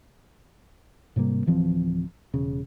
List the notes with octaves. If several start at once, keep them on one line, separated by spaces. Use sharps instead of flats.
G#2 C3 G3 A#3
D1 E3 F3 C4
E1 C#3